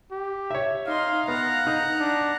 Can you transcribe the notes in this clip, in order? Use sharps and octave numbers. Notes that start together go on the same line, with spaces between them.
G4
C#5 E5
D#4 F5 C6
B3 F#5 A#5
D#4
D4